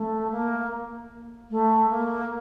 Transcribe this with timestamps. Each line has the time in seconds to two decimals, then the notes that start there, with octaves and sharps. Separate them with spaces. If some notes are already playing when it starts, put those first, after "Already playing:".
Already playing: A3
0.32 A#3
1.51 A3
1.90 A#3